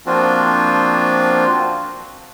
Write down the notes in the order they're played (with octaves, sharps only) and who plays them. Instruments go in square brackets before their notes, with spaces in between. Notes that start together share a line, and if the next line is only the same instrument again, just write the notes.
[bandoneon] F3 A#3 C4 D4 F4 F#4